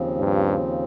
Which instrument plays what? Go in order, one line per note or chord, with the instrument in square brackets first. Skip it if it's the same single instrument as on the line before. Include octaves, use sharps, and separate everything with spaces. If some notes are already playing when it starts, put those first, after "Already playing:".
Already playing: [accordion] D#2 C#3 F3 C4
[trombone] G2